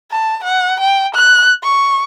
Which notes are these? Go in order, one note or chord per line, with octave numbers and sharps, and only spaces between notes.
A5
F#5
G5
F#6
C#6